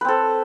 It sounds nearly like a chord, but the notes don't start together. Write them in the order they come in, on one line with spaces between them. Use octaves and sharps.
B4 C4 A4